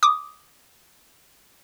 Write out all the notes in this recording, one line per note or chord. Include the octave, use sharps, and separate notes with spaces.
D6 D#6